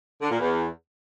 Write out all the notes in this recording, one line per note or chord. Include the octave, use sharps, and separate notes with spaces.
D3
A#2
E2